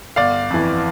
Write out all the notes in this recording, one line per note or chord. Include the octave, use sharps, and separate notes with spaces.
G1 D5 F5
F2 E3